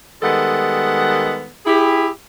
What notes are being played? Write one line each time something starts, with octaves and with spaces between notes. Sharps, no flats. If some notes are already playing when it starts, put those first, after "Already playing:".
D#3 G3 G#3 B3 A4 F#5
E4 G4 G#4